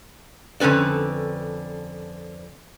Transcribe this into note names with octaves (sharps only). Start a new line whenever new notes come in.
F2 D3 C#4 B4 D5